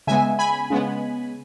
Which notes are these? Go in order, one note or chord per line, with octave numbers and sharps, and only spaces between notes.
C#3 G#3 B3 E5 G#5
G#5 B5
C#3 G#3 B3